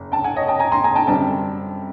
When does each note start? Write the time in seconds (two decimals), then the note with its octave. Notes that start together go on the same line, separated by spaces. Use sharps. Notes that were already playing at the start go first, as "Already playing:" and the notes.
Already playing: F#1
0.12 G5 A5
0.24 F#5 G#5
0.36 C#5 D#5
0.48 G5 A5
0.59 G#5 A#5
0.72 A#5 C6
0.84 G#5 A#5
0.95 G5 A5
1.07 F#2 D3 G3 C4 G5 A5